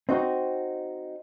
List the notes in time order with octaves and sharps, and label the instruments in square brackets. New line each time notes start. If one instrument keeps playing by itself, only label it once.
[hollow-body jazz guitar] C4 D#4 F#4